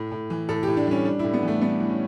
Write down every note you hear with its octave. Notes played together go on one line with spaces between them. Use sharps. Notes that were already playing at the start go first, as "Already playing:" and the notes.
Already playing: A2
A2
E3
A2 A4
A2 G4
D4
G3 C#4
G3 D4
A2 E4
B3
E3 A3
G3 B3
E3
C#4